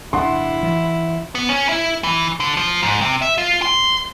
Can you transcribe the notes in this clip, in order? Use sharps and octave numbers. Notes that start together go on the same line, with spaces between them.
D1 G1 D4 E4 F#5 C6
E3
B3
C#4
E4
E3
D3
F3
G#2
C3
E5
F4
C6